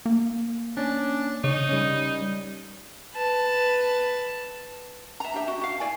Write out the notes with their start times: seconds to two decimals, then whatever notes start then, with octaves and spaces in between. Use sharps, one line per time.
0.06 A#3
0.77 C#4 D4
1.44 C#3 D#4 C#5
1.69 G3 C#4
3.15 B4 A5
5.20 E5 A#5
5.34 D4 G4 E5
5.48 F#4
5.61 F#4 F5
5.80 E4 D5 G#5